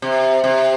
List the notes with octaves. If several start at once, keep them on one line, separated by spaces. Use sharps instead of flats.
C3
C3